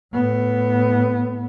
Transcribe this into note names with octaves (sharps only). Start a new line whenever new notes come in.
A2 B3